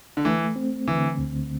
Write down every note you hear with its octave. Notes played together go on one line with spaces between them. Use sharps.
D3
E3 A3
C4
D3 E3
D2